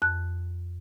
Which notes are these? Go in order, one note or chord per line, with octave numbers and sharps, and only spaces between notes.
F2 F#6